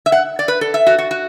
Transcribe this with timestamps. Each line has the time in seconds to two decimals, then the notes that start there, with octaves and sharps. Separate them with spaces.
0.06 E5
0.12 F#5
0.39 D5
0.48 B4
0.61 A4
0.74 E5
0.87 F#4
0.98 F#4
1.11 F#4